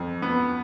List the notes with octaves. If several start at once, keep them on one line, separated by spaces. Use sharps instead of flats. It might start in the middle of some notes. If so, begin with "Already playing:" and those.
Already playing: F2
B3